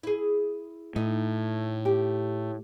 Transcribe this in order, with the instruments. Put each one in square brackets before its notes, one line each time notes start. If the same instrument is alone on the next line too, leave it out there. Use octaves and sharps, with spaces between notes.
[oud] E4 G#4
[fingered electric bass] A2 [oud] D#4
[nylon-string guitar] G4